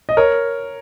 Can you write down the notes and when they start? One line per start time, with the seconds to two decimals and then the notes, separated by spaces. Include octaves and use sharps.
0.09 D#5
0.17 A#4 C#5